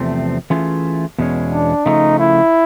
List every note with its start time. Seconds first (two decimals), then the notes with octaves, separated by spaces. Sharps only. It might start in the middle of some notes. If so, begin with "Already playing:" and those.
Already playing: E2 C3 F3 A3 C4
0.50 E3 A3 C#4 F4 G#4
1.18 E2 B2 G#3 C#4
1.52 D4
1.86 C#3 F3 A3 D#4
2.19 E4